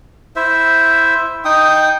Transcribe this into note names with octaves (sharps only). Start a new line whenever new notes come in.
E4 C5 E5
D#4 G5 D#6